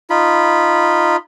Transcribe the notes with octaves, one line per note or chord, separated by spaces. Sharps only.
D#4 F4 B5